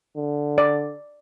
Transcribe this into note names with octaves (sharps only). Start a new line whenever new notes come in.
D3
D5